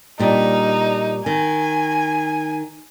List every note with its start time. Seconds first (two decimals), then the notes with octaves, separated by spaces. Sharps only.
0.19 A#2 G3 D4 D#4
1.26 D#3 G#5